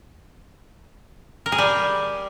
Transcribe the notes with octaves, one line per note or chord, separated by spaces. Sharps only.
A#4
G#4
G3